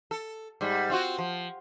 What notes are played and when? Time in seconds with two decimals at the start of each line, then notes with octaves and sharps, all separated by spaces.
0.11 A4
0.61 G#2 G3
0.90 C4 F4 F#4
1.19 F3